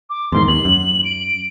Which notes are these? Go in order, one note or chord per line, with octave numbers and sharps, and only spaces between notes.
D6
E2 G#2 D#3 C6
D#2 F#7
F#2
D7